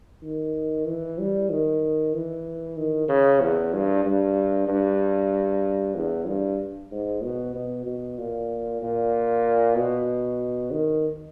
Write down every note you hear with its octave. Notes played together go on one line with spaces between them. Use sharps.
D#3
E3
G3
D#3
E3
D#3
C#3
E2
G2
G2
G2
E2
G2
G#2
B2
B2
B2
A#2
A#2
B2
D#3